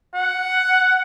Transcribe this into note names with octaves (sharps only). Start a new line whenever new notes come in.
F#5